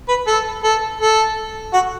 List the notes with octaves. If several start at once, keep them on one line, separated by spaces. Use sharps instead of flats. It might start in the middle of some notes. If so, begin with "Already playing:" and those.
B4
A4
A4
A4
F#4